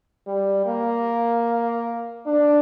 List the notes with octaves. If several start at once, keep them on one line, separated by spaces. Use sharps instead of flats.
G3
A#3
D4